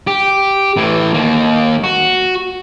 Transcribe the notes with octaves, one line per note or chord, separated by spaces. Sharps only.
G4
A2 E3
D#2 A#3
F#4